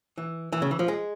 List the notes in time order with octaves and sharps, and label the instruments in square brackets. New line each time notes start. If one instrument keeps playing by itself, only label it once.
[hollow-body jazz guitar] E3
E3
C#3
E3
F3
G#3